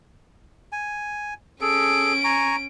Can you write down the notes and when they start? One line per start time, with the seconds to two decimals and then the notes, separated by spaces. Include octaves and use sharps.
0.72 G#5
1.61 C#4 G#4 A4 D7
2.24 G#5 A#5 C#6